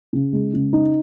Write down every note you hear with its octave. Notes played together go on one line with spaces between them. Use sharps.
C#3
G#3
C#3
D#4